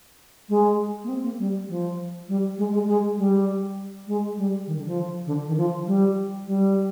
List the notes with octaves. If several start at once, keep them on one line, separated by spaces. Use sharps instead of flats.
G#3
A#3
C4
A#3
G3
F3
G3
G#3
G#3
G#3
G3
G#3
G3
D#3
D3
F3
D3
D#3
F3
G3
G3